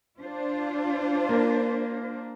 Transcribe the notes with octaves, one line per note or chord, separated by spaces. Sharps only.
D4 F4 C5
A#3